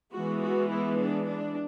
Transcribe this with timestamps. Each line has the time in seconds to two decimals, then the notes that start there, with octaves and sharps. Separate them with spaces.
0.13 E3 G#3 B3 F#4
0.42 F#4
0.70 E4
0.98 D4
1.27 D4